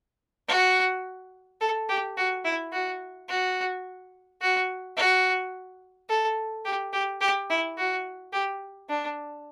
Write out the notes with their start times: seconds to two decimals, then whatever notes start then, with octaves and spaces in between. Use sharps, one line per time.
0.48 F#4
1.61 A4
1.89 G4
2.17 F#4
2.45 E4
2.72 F#4
3.29 F#4
4.41 F#4
4.97 F#4
6.09 A4
6.65 G4
6.93 G4
7.21 G4
7.50 E4
7.77 F#4
8.33 G4
8.89 D4